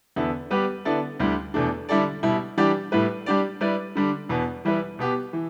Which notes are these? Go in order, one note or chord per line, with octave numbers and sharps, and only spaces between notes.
E2 D3 B3 E4 A4
G3 B3 G4 B4
D3 B3 E4 A4 D5
D2 D3 G3 E4
E2 B2 A3 D4
D3 G3 E4 A4 D5
B2 G3 E4
E3 G3 D4 G4 D5
A2 G3 E4 B4
G3 D4 G4 D5
G3 E4 B4 D5
D3 G3 D4
E2 B2 B3
E3 G3 E4 B4
B2 B3 G4
E3